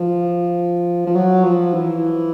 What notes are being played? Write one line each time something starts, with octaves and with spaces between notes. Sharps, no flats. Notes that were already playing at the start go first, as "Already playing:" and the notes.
Already playing: F3
F3
F#3
F3
E3